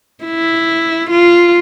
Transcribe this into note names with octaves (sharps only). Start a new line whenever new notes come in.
E4
F4